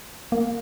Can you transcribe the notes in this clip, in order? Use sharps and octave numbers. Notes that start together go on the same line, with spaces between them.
A#3